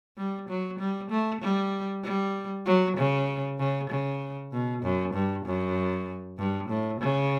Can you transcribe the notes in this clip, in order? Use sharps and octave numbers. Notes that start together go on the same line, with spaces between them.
G3
F#3
G3
A3
G3
G3
F#3
C#3
C#3
C#3
B2
F#2
G2
F#2
G2
A2
C#3